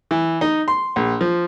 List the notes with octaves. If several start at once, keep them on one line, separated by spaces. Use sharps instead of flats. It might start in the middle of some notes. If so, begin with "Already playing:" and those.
E3
D#4
C6
A#1
F3